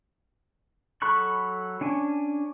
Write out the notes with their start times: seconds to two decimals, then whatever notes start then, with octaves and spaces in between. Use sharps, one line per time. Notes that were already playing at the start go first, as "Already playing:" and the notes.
1.02 F#3 A4 B5 C#6 F#6
1.81 C#4 D4 G#5